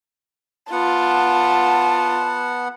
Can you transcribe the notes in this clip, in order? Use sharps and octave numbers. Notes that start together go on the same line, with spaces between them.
B3 F4 F#5 A5